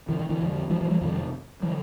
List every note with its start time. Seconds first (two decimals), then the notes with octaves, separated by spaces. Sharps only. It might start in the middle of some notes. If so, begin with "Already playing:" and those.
0.09 D3 E3
0.19 D#3
0.29 D3 E3
0.40 F2 D3
0.70 E3 F#3
0.81 E3 F#3
0.91 F3 G3
1.01 F2 C3 D#3 F3
1.62 D3 E3 F#3